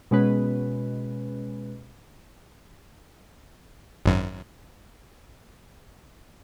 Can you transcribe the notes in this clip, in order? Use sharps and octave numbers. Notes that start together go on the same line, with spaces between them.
B2 G#3 C#4 B4
G#1 F#2